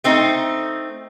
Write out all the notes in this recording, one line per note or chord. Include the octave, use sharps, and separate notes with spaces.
A3 C4 D#4